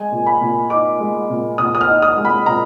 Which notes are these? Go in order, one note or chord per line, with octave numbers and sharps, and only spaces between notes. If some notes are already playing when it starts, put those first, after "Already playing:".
Already playing: G#3 G#5
A#2
B5
A#2
D#4 D6
G#3
A#2
A#2 D#6
D#6
F6
D#4
D#6
G#3
B5
A#2 A#5